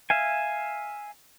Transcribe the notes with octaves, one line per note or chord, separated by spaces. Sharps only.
E5 F5 G#5